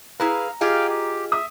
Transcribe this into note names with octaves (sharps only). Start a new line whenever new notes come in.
E4 G#4 B4 F5 A#5
F4 G4 G#4 D#5 F5 G5
G4
E5 D#6